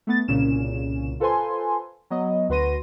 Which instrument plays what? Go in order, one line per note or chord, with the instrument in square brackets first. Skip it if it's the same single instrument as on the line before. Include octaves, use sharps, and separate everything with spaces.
[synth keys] A3 B3 A6
C2 A#2 C#3 C#4 E7
F4 A4 B4 C5 G#5 C6
F#3 B3 D#5
D2 F#4 B4 C6 A#6 D#7